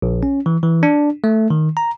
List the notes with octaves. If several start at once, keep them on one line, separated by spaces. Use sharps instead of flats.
A#1
C#4
E3
E3
D4
A3
D#3
A#5